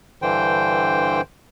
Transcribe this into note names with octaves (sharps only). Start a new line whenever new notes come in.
G2 D3 E3 C5 G5